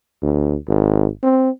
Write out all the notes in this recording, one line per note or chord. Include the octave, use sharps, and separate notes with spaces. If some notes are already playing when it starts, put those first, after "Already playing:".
D2
G#1
C4